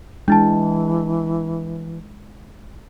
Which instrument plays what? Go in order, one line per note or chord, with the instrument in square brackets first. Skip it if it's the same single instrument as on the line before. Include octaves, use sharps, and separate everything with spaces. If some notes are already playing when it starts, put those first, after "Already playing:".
[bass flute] E3 [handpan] G#3 [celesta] D4 E4 A5